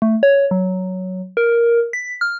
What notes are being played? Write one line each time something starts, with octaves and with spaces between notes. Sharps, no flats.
A3
C#5
F#3
A#4
B6
F6